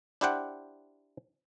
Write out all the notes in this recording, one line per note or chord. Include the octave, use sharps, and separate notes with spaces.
D4 E4 G4 C5 F#5 G5